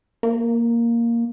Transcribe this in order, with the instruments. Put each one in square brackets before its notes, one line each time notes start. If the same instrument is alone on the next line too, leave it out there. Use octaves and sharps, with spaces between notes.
[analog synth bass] A#3